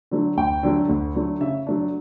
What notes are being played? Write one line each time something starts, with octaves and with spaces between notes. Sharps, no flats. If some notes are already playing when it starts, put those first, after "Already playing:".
D3 F#3 A3
D2 G5
D3 F#3 A3
D2
D3 F#3 A3
C#3 E5
F#3 A3 D4